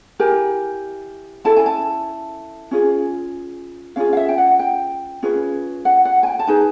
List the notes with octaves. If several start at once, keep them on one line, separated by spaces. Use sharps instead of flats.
E4 G4 A#4 G#5
C#4 E4 A4 A5
G#5
A5
C#4 F4 G#4
C#4 F4 G#4 F5
F5
E5
G5
F#5
G5
C#4 F4 G#4 B4
F#5
F#5
G#5
G5
A5
D#4 G#4 B4 G#5